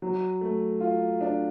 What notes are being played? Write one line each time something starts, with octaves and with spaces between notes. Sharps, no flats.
F#3
A3
F4
D4